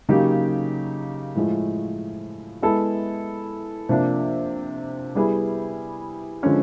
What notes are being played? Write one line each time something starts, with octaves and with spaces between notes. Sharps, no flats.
C#3 F#3 A#3 D#4 G4
A2 F3 G#3
G#3 B3 E4 A4
C3 F3 A#3 D4
G3 B3 E4 G#4
D3 F3 G#3 C#4